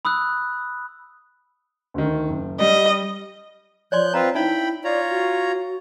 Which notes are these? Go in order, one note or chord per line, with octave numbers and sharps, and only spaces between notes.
B5 D#6 E6 F#6
D2 D#3
F#1
G3 D#5
F3 C#5 D5 C6 F#6 G6
C4 F4 B4 A#5
C#4 D#4 E4 E5 G5 B5
F4 C#5 D5 A#5
F#4